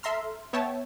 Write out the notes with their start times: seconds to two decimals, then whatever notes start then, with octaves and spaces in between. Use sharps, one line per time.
0.03 A4 E5 A#5 C6 F6
0.53 B3 C#5 E5 G5 A5